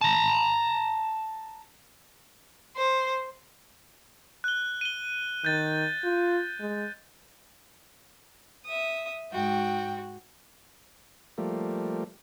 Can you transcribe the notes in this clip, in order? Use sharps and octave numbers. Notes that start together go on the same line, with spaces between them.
A5 A#5
C5
F#6 G7
D#7 G7
D#3 G6 A6
F4
G#3
E5 D#6
G#2 F#4 G5
F3 G3 A3 A#3